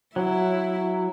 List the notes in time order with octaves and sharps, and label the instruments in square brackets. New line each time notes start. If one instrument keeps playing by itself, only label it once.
[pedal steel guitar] F#3 [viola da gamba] E4